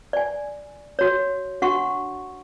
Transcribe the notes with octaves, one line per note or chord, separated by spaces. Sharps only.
D5 G#5
F#4 C#5
D4 F#4 F#5 C#6